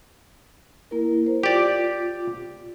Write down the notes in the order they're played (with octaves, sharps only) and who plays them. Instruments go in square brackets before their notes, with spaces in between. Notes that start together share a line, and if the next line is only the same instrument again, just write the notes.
[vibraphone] A#3 E4 A#4
C5
[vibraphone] F4 [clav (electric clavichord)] G4 D5